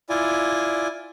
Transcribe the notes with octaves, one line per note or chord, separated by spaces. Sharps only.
E4 F4 D5 G#5